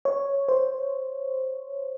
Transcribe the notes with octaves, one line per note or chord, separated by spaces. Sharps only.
C#5
C5